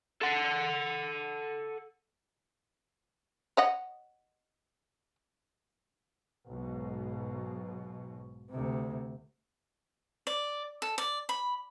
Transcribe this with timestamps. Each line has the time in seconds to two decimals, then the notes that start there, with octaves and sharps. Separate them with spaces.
0.21 A4 F#5
3.57 C#5 D#5 F#5
6.49 B1 G#2 B2
8.51 D2 C3
10.27 D5
10.82 A4
10.98 D5
11.29 B5